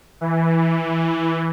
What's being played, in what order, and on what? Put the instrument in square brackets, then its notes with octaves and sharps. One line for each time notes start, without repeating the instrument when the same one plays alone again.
[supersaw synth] E3